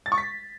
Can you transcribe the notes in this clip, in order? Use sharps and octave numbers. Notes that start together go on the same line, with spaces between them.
A6
C#6
B6